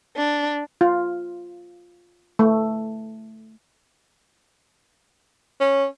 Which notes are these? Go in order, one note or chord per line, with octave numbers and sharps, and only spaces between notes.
D4
F4
A3
C#4